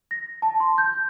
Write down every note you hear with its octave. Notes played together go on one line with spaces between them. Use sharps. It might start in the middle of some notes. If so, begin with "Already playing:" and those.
A#6
A5
C6
G6